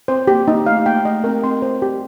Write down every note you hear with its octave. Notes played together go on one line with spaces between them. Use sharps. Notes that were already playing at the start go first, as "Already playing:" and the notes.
C4 C5
A#3 G4
A#3 D#4
A3 F5
A#3 G5
A3 D#5
C4 A#4
C4 C6
C5
G4